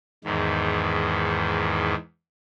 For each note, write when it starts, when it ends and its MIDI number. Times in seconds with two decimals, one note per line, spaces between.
0.24 1.95 40
0.24 1.95 44
0.24 1.95 51